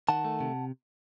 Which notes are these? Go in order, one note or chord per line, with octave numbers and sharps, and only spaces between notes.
D#3 F#5 A5
A3
C3